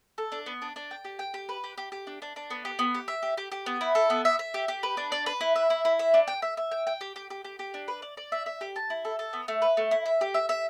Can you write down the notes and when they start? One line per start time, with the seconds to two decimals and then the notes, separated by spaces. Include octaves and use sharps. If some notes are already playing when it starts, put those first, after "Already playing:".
0.18 A4
0.32 D4
0.46 B3
0.62 D4
0.76 D4
0.91 G5
1.05 G4
1.19 G5
1.34 G4
1.49 B4
1.64 G4
1.78 G4
1.92 G4
2.07 D4
2.22 D4
2.36 D4
2.50 B3
2.65 G4
2.79 B3
2.94 G4
3.08 E5
3.23 G4
3.37 G4
3.52 G4
3.66 B3
3.81 E4
3.95 A4
4.10 B3
4.25 E5
4.39 E5
4.54 G4
4.68 G4
4.83 B4
4.97 D4
5.12 D5
5.26 B4
5.41 E4
5.56 E5
5.70 E4
5.85 E4
5.99 E5
6.14 D4
6.28 G5
6.42 E5
6.57 E5
6.71 G5
6.87 G5
7.01 G4
7.16 G4
7.30 G4
7.44 G4
7.59 G4
7.74 D4
7.88 B4
8.02 D5
8.17 D5
8.32 E5
8.46 E5
8.61 G4
8.76 A5
8.90 E4
9.05 A4
9.19 A4
9.33 B3
9.48 A3
9.62 B4
9.77 A3
9.91 E4
10.06 E5
10.21 G4
10.34 E5
10.49 E5